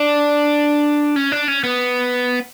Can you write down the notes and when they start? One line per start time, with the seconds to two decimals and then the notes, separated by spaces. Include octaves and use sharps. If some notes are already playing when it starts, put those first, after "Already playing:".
Already playing: D4
1.16 C#4
1.32 D4
1.48 C#4
1.64 B3